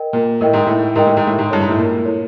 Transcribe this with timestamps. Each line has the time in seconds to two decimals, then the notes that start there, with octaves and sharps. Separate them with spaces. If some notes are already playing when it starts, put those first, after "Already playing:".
Already playing: A#4 D#5 G5
0.13 A#2
0.41 A2 A#4 D#5 G5
0.53 G#2
0.66 A2
0.96 G#2 A#4 D#5 G5
1.07 A2
1.17 G#2
1.27 A2
1.39 G#2
1.51 G2 E4 A4 C#5
1.61 G#2
1.69 A2
1.78 A#2
2.05 E4 A4 C#5